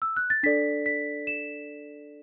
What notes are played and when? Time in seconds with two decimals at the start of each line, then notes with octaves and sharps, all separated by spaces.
0.02 E6
0.17 F#6
0.30 A6
0.43 D4 A4 D5 B6
0.86 B6
1.27 E7